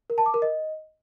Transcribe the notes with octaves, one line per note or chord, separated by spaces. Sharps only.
A#4
A5
D6
A#4
D#5